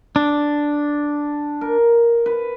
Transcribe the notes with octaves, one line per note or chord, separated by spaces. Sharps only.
D4
A#4
B4